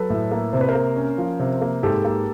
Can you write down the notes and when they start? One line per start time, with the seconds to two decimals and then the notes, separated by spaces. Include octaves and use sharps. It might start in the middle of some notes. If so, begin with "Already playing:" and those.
Already playing: F#3 A4 B4
0.10 A2
0.32 A#3
0.53 C3 C5
0.61 B4
0.69 A#4 C5
0.75 A#3
0.96 C#4
1.18 F3
1.40 C3
1.62 A#3
1.83 G#2 G4 A4
2.05 A#3